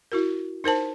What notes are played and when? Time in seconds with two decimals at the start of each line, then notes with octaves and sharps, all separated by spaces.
0.12 E4 F#4 A#4
0.64 D#4 A#4 C5 A5